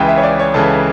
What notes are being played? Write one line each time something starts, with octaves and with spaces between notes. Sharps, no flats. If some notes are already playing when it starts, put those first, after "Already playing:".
Already playing: C#2 C#3 E3 G5
E5
C#5
D5
C#5
C#2 C#3 E3 A4